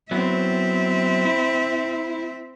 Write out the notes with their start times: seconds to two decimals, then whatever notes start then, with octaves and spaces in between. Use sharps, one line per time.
0.11 F#3 B3 C4 E4 E5
1.25 E4